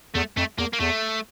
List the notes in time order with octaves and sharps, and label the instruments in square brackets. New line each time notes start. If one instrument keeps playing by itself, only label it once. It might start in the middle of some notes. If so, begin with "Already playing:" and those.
[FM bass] E2 [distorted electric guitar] A3
[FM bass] F2 [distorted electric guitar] A3
[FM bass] E2 [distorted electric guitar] A#3
[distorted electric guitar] A#3
[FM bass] E2 [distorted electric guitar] A3